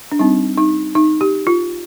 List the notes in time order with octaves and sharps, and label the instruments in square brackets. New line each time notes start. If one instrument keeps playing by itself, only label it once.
[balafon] D4
G3 C4 D#4
D#4
D#4
G4
F4